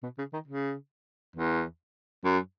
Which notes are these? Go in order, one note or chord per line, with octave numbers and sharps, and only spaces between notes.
B2
C#3
D#3
C#3
E2
F#2